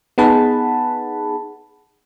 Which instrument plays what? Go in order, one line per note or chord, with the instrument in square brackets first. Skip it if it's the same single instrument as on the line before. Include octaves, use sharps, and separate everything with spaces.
[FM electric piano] B3 D#4 G#4 F#5 A5 B5